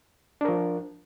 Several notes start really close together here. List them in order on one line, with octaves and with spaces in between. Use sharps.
D4 A#4 F3